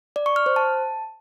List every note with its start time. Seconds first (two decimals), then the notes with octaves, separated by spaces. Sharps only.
0.16 D5
0.26 C#6
0.36 F6
0.46 C5
0.56 A5